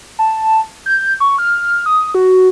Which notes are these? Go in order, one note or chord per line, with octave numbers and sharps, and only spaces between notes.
A5
G6
C#6
F6
D#6
F#4